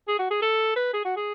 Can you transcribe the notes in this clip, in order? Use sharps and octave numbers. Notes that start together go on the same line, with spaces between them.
G#4
F#4
G#4
A4
B4
G#4
F#4
G#4